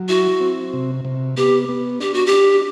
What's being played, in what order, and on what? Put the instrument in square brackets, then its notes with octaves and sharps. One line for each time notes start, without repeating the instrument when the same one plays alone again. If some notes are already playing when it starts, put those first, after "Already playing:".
Already playing: [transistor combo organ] F#3
[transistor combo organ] E4 [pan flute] F#4
[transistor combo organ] C4
C3
C3
[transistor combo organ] B3 [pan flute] G4
[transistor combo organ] B3
[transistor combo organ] D4 [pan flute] G4
[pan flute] F#4
G4
[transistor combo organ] D4